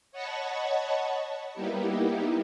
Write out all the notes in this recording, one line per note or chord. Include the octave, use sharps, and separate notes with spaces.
C#5 D#5 F#5 A5 B5 C#6
G3 A#3 B3 D#4 E4 G4